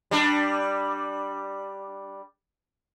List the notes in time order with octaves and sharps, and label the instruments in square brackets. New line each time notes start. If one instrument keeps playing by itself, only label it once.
[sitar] G3 D4